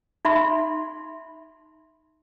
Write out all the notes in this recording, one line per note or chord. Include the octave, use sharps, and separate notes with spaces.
D#4 E5 B5 C6